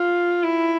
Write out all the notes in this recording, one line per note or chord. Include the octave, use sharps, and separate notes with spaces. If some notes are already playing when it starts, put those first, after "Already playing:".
Already playing: F4
E4